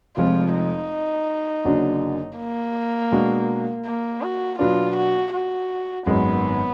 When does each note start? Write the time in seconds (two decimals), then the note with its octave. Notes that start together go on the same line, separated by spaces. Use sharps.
0.17 F1 F2 F3 G#3 F4
0.54 D#4
1.65 F#1 F#2 D3 F#3 D4
2.38 A#3
3.12 B2 G#3 D4 F#4
3.85 A#3
4.22 F#4
4.59 B2 F#3 B3 D4 F4
4.96 F#4
5.33 F#4
6.06 G#1 F#2 D#3 G#3 B3